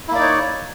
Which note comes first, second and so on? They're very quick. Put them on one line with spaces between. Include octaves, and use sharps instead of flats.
E4 A#3 D5 D#4 C#5